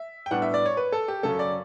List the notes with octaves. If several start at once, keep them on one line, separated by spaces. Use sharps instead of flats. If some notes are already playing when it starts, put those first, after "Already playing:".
Already playing: E5
G5
A2 G3 B3 D4 F#5
E5
D5
C#5
B4
A4
G4
F#2 C#3 F#3 C#4 A4
D5